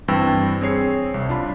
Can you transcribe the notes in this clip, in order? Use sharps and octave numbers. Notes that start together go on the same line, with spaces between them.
G2 E3 C4 G5 E6
C4 G#4 C#5 C7
C2
D4 F4 B5